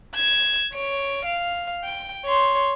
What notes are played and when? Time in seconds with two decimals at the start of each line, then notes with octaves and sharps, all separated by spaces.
0.15 G#6 E7
0.74 C#5 D7
1.25 F5
1.84 G5
2.25 C#5 C6